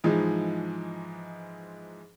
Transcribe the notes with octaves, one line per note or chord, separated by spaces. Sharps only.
G#2 E3 F3 G#3 D#4